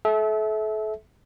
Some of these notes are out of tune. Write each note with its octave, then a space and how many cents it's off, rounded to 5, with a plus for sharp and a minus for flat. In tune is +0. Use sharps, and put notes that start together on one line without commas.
A4 -35 E5 -20